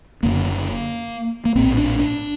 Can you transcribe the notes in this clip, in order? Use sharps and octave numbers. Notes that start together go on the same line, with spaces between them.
F#1 F#2 D3 A#3
A#3
A#1 A2 C4
D4
D4